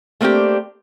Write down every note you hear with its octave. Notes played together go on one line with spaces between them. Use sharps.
A3 A#3 C4 D4 G4